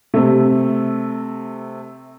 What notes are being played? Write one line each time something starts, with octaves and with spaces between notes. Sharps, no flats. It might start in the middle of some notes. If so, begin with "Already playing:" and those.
C3 A3